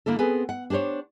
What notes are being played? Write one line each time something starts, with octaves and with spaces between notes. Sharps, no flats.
D3 A#3 E4 A4
B3 C4 G#4 A4 B4
F#5
D4 G4 A4 C5 C#5